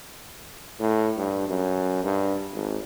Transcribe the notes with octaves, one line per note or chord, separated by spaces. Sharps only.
A2
G2
F#2
G2
G#1